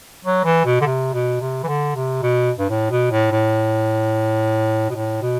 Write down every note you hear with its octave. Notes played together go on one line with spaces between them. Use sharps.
F#3
E3
B2
D3
C3
B2
C3
E3
D3
C3
B2
G2
A2
B2
A2
A2
B2
A2
B2